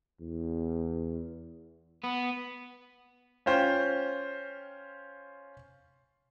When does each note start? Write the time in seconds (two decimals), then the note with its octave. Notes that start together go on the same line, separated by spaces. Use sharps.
0.21 E2
2.04 B3
3.46 C#4 F4 C5 G5